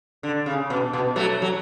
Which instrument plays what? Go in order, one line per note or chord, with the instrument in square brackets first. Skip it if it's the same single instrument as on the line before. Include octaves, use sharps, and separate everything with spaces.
[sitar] D3
C#3
B2
B2
F#3 A3
F#3